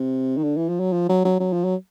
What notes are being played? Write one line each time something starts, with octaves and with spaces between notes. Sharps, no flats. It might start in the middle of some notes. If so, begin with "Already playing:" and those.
Already playing: C3
D#3
D3
E3
F3
F#3
F3
F#3
F#3
F#3
F3
F#3